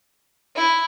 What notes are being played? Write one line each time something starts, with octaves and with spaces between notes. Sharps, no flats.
E4